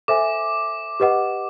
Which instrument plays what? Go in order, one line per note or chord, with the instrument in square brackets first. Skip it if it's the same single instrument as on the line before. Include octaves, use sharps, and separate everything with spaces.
[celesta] A4 C5 E5 G#5 [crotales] D6
[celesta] G4 B4 D#5 F#5